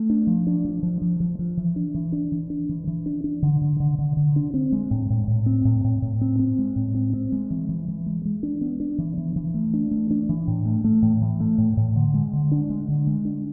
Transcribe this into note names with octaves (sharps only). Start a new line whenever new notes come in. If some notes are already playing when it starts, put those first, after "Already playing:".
Already playing: A3
D4
F3
D4
F3
F3
F3
F3
F3
E3
D4
E3
D4
E3
D4
E3
E3
D4
D4
D3
D3
D3
D3
D3
D4
C4
G#3
A2
A2
A2
C4
A2
A2
A2
C4
C4
G#3
A2
C4
C4
G#3
E3
E3
E3
G#3
G#3
D4
B3
D4
E3
E3
E3
A3
D4
A3
D4
E3
A2
A3
A3
A2
E3
A3
A2
A2
D3
G#3
D3
D4
G#3
D3
G#3
D4